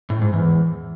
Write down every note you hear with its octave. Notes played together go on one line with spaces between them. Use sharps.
A2
G#2
E2